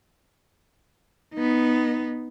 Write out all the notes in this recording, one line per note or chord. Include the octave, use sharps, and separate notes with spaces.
B3 D#4